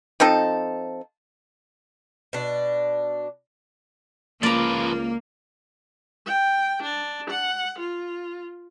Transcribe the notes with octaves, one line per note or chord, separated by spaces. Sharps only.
F3 C4 D#4 A4
B2 D4
C#2 F3 A#3 B4 D5 A#5
G5
D4
F#5
F4